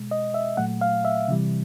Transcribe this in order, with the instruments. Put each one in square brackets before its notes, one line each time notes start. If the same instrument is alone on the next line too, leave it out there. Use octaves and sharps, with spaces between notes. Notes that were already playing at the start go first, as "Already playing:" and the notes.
Already playing: [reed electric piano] B2 G#3
D#5
E5
A#2 F#3 A3 F#5
F5
E5
C3 E3 G3